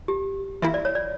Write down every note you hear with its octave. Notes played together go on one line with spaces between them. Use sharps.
G4
E3 A#3 E4 E5
D5
C#5
D5